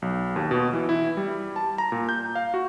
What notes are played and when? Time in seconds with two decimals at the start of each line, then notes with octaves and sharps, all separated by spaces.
0.02 B1
0.36 D#2
0.51 B2
0.73 E3
0.89 E4
1.17 G3
1.56 A5
1.78 A#5
1.92 A#2
2.09 G6
2.35 F5
2.54 F#4